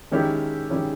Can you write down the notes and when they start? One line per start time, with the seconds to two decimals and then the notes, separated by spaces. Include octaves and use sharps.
0.12 D#3 G#3 C#4 E4 G4
0.70 D#3 G#3 C#4 E4 G4